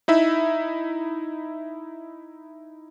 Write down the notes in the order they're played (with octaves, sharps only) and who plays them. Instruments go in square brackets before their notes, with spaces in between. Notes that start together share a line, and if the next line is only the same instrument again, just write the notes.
[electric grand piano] D#4 E4 E5